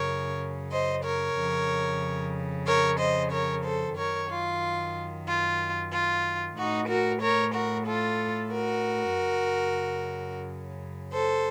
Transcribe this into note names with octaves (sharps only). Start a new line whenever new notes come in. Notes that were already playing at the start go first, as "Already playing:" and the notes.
Already playing: F#2 C#3 A#4 C#5
C5 D#5
A#4 C#5
F2 C#3
A#4 C#5
C5 D#5
A#4 C#5
A4 C5
F#2 D#3 A#4 C#5
F4
F4
F4
A2 D#4 F#4
F#4 A#4
A#4 C#5
F#4 A#4
F4 A4
F#4 A#4
F#2 C#3
A4 C5